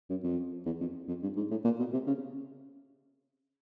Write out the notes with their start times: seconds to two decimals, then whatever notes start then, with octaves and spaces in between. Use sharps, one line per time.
0.10 F#2
0.24 F2
0.66 E2
0.80 F2
1.08 F2
1.22 G2
1.37 G#2
1.51 A2
1.64 A#2
1.79 B2
1.93 C3
2.07 C#3